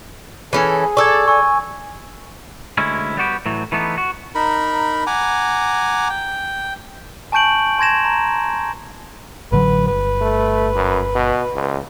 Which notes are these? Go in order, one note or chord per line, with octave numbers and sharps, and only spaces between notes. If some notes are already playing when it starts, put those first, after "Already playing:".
E3 C#4 G#4 A4
A4 D5 C#6 E6 G#6
G#5 C#6 E6
D2 G#3 C#4 E4
G3 B3 F#4 G4
A2 E3 F#3
E3 A3 B3 D#4
F#4
D#4 A#4 B5
F#5 G#5 A#5 D6
G5
G#5 A5 C#6 G6 D7 F#7
A5 C6 G#6 A#6 E7
A#5
A1 D3 F#3 B4
G1 B4
A3
F#2
B2
C#2